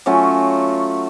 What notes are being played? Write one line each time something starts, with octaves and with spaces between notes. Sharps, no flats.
F#3 A3 C#4 F4